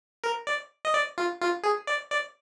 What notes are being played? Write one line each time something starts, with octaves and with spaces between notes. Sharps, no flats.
A#4
D5
D#5
D5
F4
F4
G#4
D5
D5